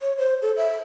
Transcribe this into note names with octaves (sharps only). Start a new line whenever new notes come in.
C#5
C5
A4
E5